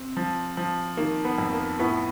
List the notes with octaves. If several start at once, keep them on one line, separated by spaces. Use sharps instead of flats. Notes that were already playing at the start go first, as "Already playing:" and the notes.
Already playing: C4
F3
F3
D#3 A#3
B3
F2
A#3
A2 B3